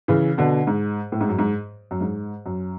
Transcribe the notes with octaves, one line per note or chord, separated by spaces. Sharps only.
C#3 E3
B2 D3
G#2
A2
G#2
F#2
G#2
F#2
G#2
F#2